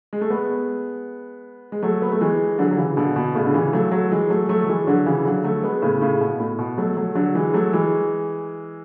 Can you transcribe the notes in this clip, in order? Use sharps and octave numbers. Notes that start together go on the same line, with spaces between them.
G#3
A3
G#3 B3
G#3
F#3 A3
B3
A3
E3 G#3
D3 F#3
F#3
C#3 E3
B2 D3
B2
A2 C#3
D3
C#3 E3
F#3 A3
F#3 A3
E3 G#3
F#3 A3
F#3 A3
F#3
E3 G#3
D3 F#3
C#3 E3
D3 F#3
F#3 A3
G#3 B3
A2 C#3
A2 C#3
C#3
B2
A2
B2
F#3 A3
F#3 A3
D3 F#3
E3 G#3
F#3 A3
E3 G#3